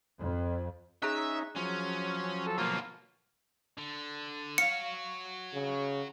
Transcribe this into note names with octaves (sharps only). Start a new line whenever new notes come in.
F2
C#4 D#4 G#4 E5 A#5 F#6
F3 F#3 C#4
A4
B2 A#3 F4
D3
F#4 C#5 F5 C#7
C#3